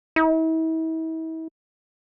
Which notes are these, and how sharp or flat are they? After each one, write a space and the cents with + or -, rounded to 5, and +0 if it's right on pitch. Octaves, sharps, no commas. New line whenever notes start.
E4 -40